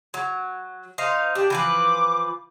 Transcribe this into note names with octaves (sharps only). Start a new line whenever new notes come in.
F#3
D#4 C5 F5
D4 G4
E3 F3 B4 D6